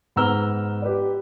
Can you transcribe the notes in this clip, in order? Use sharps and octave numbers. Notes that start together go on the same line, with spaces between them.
G#2 B3 A#5 E6 F6 G7
G4 B4 D5